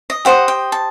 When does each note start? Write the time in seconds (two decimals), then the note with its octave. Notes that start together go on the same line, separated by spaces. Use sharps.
0.10 D#5
0.25 G4 C5 D#5 F#5
0.48 G5
0.72 A5